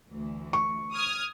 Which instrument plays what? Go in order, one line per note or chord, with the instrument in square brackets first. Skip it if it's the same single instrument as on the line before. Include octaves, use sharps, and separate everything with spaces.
[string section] D2 E3
[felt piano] C#6
[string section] D#6 F6 G#6